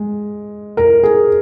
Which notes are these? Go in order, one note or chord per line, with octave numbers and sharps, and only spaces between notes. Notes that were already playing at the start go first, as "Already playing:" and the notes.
Already playing: G#3
A#4
G#4